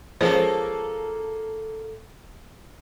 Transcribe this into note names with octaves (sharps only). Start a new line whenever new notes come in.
F3 G#3 A#3 C#4 A4 C5